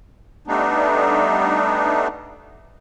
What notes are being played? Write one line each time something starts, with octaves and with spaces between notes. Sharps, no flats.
G3 A3 B3 D4 D#4